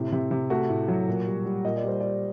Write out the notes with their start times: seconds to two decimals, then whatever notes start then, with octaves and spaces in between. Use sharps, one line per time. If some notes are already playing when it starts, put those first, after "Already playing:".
Already playing: A2 C3
0.12 C3
0.31 C3
0.50 A3 F#4
0.70 A2
0.88 F#3
1.08 A#2
1.27 G3
1.45 G3
1.65 A#2 D#5
1.76 D5
1.84 G3 C5
2.00 G3 D5